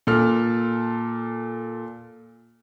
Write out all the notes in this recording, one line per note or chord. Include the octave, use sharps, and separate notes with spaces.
A#2 A4 F6